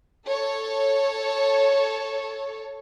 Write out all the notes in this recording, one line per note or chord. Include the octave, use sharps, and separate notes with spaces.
A4 C#5